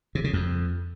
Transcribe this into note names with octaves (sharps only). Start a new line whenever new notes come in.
C3
C#3
F2